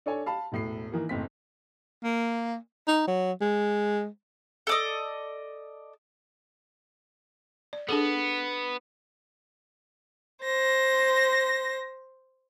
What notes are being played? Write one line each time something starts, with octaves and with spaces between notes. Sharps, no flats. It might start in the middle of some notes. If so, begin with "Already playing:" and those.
D4 A4 C#5 G#5
F5 A5 B5
E1 A2 C7
D#3 E3 A#3
F#1 A2 C4 B6
A#3
D#4
F#3
G#3
A4 D5 D#5
D5
B3 D4 G#4 A4
C5 A#6